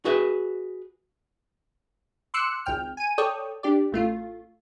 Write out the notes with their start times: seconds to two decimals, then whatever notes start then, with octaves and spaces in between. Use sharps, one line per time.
0.05 F#4 G#4 B4 E5
2.34 C6 D6 E6 F#6 C#7
2.66 G#1 C#2 G5 F6
2.97 G#5 D#7
3.18 A4 C#5 D5 G5 D#6
3.63 D4 G4 D5
3.92 A1 A3 F4